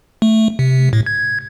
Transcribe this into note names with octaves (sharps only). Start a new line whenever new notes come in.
A3
C3
A2
G#6